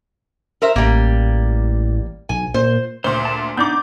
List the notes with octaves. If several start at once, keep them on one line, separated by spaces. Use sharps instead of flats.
A#4 C5 E5
A1 G3 A#3
B1 G#5
A#2 C5
D2 A#2 C5
A5
B3 D4 D#4 D6 G6